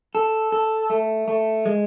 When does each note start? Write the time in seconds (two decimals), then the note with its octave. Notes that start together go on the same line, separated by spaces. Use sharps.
0.15 A4
0.52 A4
0.90 A3
1.28 A3
1.66 G#3